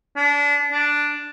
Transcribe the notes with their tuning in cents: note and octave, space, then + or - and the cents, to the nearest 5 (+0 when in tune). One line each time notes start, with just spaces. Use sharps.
D4 -30
D4 +0